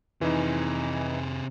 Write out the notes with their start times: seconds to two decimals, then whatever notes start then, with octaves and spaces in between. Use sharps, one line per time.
0.21 F2 C3 E3 D#4 G#4